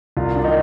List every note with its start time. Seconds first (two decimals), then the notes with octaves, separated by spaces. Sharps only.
0.17 C2 F4
0.36 D4
0.44 D#3 D#4